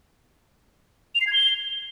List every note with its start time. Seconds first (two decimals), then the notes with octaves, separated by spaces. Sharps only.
1.15 F7
1.21 C7
1.27 G#6
1.33 G7